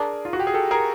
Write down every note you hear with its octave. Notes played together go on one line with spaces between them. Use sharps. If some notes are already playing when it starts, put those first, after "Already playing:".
Already playing: D4 G#4 A#4
F4
F#4
G4
G#4
G4 A4
G#4 A#4